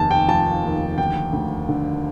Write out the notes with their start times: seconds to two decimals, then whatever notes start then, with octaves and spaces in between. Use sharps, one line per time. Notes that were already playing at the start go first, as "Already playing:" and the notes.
Already playing: F1 D#2 A5
0.11 G5
0.28 F3 A5
0.64 D#2
0.98 D2 G5
1.33 D2
1.69 D3